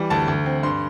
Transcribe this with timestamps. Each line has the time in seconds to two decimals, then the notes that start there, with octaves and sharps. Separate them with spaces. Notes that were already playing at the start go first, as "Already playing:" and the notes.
Already playing: E3 G3
0.10 D2 A5
0.28 D2
0.46 C4
0.63 G2 C6